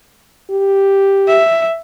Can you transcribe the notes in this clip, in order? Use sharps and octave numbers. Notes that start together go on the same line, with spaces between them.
G4
E5